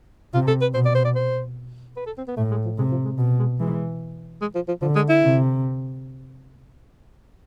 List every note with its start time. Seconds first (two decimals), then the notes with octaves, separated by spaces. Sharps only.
0.33 C3 F4
0.47 A4
0.61 B4
0.74 B2 C5
0.85 D5
0.95 C5
1.05 D5
1.15 C5
1.96 B4
2.06 A4
2.17 C4
2.27 B3
2.37 A2 A3
2.51 G#3
2.65 F3
2.78 C3 G#3
2.91 F3
3.05 G#3
3.18 B2
3.39 G#3
3.60 E3 G#3
4.41 G#3
4.55 F3
4.68 F3
4.82 D3 F3
4.95 G#3
5.09 E4
5.22 C3